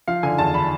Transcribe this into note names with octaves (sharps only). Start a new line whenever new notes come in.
F3 F5
D3 G#5
E2 A5
B5